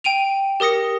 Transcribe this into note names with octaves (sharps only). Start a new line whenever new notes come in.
G5 D7 D#7 F7
G4 A#4 D#6 A#6 C#7